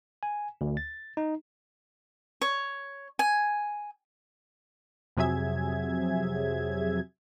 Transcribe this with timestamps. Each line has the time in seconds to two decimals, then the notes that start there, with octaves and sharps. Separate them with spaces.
0.23 G#5
0.61 D2
0.77 A6
1.17 D#4
2.42 C#5
3.19 G#5
5.17 F2 C3 F#3 G#4 E5 G#6